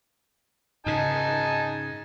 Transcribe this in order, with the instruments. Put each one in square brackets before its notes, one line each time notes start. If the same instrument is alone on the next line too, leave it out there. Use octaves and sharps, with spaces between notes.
[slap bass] G#2 C#3 [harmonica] D#4 G#5 A5